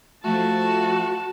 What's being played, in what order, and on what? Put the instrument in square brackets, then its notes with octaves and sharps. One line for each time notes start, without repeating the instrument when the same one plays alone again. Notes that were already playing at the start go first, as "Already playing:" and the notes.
[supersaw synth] F3 A3 [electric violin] F#4 [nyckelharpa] A5